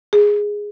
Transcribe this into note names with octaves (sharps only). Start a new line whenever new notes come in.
G#4